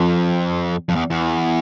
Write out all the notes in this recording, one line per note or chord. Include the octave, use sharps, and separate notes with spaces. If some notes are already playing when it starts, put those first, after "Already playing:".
Already playing: F2
F2
E2
E2